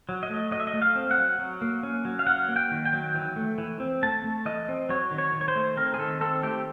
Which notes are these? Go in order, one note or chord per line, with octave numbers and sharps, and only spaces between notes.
F#3
D#5
A3
F#3 D#5
E5
D#5
A3
F5
C4
F#5
F#3
F#3
A#3
C#4
F#3
F5
F#3 F#5
A#3
G5
D#3
G5
F#3
E3
A3
E3
C4
A3 A5
A3
E3 D#5
C4
F#3 C#5
D#3
C#5
D#3
C#5
C5
A3
C4 A#4
G#4
D#3 A4
C4 A4
A3 G4